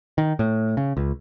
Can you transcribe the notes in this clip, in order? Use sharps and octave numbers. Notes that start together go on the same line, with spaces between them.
D#3
A2
C#3
C#2